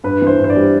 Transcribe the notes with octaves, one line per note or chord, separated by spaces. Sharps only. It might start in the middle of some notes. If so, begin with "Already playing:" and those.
G2 B4
E3 C5
G2
C5
D5
G3